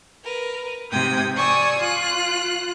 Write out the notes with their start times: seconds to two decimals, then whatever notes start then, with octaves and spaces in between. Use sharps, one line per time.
0.24 A#4 B4
0.92 G#2 C3 G5 D#6 G#6
1.37 D5 G#5 C#6 D#6 E6
1.79 F4 F#6